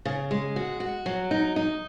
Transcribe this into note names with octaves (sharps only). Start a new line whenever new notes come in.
C#3
G#3
F#4
F#4
F#3
D#4
D#4